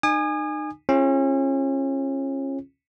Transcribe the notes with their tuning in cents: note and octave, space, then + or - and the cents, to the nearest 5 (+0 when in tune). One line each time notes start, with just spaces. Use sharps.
D#4 -35 G#5 -10 D#6 -40
C#4 -35 F4 -35 G#4 +0